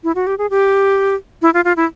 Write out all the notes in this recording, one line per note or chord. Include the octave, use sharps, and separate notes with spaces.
E4
F#4
G4
G#4
G4
E4
F4
F4
E4